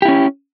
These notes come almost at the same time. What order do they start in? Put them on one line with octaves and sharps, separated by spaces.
G4 E4 C#4